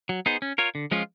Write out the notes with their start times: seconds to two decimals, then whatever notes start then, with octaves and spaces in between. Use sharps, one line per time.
0.09 F#3
0.26 B3 D#4 G#4 C5
0.42 C#4
0.58 F4 A#4 C#5
0.75 D3
0.91 F3 G#3 C#4 F4